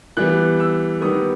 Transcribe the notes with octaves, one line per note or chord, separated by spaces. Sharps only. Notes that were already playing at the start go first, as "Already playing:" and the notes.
E3 G3 B3 F#6
E6
D#3 G3 B3 D#6